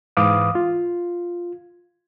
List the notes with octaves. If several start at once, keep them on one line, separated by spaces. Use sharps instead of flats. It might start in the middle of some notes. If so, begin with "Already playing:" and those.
G#2 E3 B4 F5 D6 D#6
F4